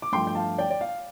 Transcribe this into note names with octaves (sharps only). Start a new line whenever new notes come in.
D6
G2 F3 A3 G5 C6
G5
F5 A5
D5 G5
D5
F5